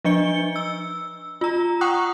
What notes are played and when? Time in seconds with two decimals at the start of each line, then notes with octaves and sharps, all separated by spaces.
0.05 F3 D4 D#5 C#7 G7
0.56 E6
1.41 F4 A#5
1.81 F#5 G5 C#6 D#6 F#6